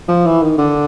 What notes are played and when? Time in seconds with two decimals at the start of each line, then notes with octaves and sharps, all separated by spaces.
0.08 F3
0.26 E3
0.42 D#3
0.58 D3